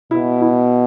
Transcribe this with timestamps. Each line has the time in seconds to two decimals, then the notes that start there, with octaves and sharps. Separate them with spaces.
0.11 B2 E4
0.42 E4